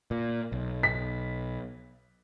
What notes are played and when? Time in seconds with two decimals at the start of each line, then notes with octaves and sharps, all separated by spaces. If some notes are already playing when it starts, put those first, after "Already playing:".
0.11 A#2
0.52 B1
0.83 B6